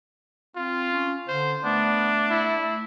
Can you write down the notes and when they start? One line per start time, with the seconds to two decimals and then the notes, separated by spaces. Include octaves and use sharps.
0.56 C4 F4
0.92 C#4
1.28 D3 C5
1.64 A3 B3 D4
2.31 E4